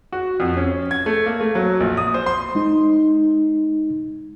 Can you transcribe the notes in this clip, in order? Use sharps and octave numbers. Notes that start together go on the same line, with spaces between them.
F#4
F2
C#4
G#6
A3
A#3
A3
F#3
A#1
D#6
C5
C6
G#3 D#4